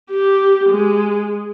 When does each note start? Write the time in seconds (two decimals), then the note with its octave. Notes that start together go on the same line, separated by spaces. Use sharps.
0.11 G4
0.70 G#3